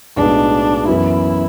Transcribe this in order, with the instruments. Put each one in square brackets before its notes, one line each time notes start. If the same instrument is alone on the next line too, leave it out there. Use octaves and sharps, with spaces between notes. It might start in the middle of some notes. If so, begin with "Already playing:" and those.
[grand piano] B1 A2 G#3 B3 F#4 [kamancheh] D4
[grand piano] F#2 E3 B3 [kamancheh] E4